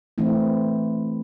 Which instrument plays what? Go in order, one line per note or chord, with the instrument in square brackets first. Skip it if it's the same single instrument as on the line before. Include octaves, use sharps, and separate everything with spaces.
[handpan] E3 A3 C4 E4